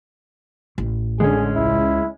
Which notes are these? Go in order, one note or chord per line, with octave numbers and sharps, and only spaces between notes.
A1
D3 G#3 C#4 G#4
C#2 E4